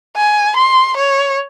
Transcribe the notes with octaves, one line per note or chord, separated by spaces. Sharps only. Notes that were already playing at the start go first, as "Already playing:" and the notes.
G#5
C6
C#5